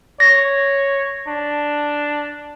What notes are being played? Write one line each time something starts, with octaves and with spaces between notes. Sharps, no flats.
C#5 A#6
D4